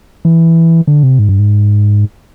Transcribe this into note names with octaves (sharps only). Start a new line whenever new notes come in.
E3
D3
C3
G#2
G2
G#2